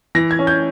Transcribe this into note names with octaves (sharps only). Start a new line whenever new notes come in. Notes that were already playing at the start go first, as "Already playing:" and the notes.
E3 A#6
G#6
C#4
G6